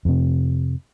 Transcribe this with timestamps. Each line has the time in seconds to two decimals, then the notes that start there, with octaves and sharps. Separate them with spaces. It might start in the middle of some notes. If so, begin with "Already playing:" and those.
0.05 F2 C3